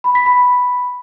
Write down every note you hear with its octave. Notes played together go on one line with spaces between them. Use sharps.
B5
B6
B5